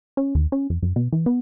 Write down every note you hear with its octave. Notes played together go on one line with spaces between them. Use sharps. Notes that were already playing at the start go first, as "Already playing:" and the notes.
C#4
D#2
C#4
F2
F#2
B2
E3
B3